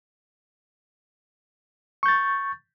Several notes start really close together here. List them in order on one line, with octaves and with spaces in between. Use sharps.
C#6 G6 A6